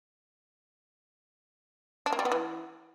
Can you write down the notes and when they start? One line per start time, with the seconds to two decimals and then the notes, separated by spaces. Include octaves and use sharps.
2.06 D4
2.13 A#3
2.19 G3
2.25 B3
2.32 E3